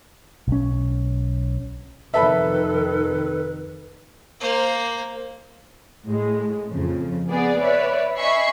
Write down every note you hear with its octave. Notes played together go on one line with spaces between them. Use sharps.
B1 C#4
F2 C3 D#3 A4 B4 E5 A5 B5
A#3 C5
A2 G#3
F2 C#3 F3
B3 G#4 D5
B4 C#5 D5 E5
D#5 E5 G#5 B5 C#6 C7